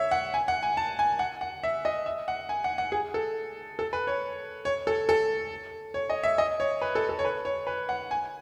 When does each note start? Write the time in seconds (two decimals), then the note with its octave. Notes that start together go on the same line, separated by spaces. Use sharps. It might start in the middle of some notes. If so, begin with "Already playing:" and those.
Already playing: C#5 E5
0.11 F#5
0.34 G#5
0.48 F#5
0.63 G#5
0.77 A5
0.99 G#5
1.19 F#5
1.41 F#5
1.63 E5
1.85 D#5
2.06 E5
2.28 F#5
2.49 G#5
2.64 F#5
2.78 F#5
2.92 G#4
3.14 A4
3.79 A4
3.93 B4
4.07 C#5
4.65 C#5
4.87 A4
5.09 A4
5.94 C#5
6.10 D#5
6.24 E5
6.38 D#5
6.60 C#5
6.81 B4
6.95 A4
7.09 A4
7.19 C#5
7.25 B4
7.45 C#5
7.67 B4
7.89 F#5
8.11 G#5